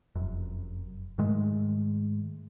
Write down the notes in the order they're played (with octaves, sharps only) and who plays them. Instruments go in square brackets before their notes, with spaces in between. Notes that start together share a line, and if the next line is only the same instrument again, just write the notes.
[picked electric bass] F1 F#2
G#2 D#3 G#3 A3